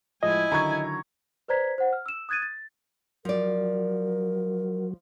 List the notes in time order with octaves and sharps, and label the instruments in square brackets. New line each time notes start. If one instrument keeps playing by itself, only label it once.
[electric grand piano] A2 F3 G#3 [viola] E4 G#5 [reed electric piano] D#5
[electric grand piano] D3 D#3 F#3 [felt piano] A#5 C#6 G#6
[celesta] B4 C5 D5 A#5 G#6 B6
C5 F#5
F6
E6 E7
D#6 F#6 G#6 A6 D#7
A6
[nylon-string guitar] F3 D5 [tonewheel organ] F#3 [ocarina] A#4